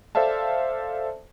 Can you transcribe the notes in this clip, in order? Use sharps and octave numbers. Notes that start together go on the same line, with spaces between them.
A4 C5 D5 E5 F5 A5